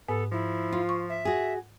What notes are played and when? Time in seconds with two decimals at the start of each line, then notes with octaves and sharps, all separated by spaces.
0.09 G#2 B3 A4
0.32 F3 E4
0.72 F4
0.89 C#6
1.09 E5
1.25 F#4 G#4